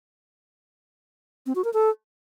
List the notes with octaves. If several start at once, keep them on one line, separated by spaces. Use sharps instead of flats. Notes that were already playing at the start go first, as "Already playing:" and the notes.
C4
F#4
A#4
A4